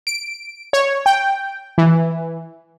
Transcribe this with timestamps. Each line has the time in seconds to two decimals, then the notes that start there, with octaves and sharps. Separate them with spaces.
0.07 D7
0.73 C#5
1.06 G5
1.78 E3